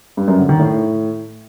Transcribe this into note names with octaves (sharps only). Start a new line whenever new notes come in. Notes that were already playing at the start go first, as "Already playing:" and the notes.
G2
F#2
D3
D#3
A2